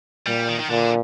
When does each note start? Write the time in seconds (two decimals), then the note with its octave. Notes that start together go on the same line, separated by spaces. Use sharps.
0.26 A#2 G3
0.49 D#3
0.60 D#3
0.70 A#2 D3